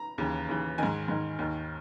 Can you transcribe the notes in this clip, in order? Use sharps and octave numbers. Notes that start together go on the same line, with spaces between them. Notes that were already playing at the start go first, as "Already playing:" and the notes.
Already playing: A#5
D#2 C#3 E3
D#2 C#3 E3
G#2 D#3 G#5
G#2 D#3
D#2 D#3